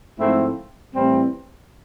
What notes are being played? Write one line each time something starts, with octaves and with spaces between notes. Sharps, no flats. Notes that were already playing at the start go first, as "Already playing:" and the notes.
G#2 F3 A3 C4 E4
A2 E3 G3 C4